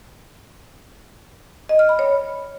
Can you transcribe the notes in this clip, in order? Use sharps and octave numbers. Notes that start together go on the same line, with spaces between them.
D#5
F6
B5
C#5